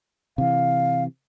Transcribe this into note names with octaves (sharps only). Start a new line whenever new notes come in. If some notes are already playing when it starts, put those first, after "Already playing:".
C3 E3 F5